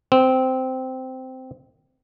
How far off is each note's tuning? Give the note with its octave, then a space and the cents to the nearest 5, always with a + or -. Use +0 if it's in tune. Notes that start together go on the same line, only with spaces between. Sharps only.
C4 -10